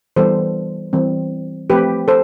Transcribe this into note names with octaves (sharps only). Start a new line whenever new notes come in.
E3 G3 B3 A4 C5
E3 G3 C4
F3 A3 C4 G4 B4
A4 C5